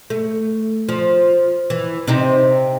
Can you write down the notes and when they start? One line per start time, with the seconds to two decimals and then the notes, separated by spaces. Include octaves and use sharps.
0.10 A3
0.89 F3
1.70 E3
2.07 C3 C4 D#4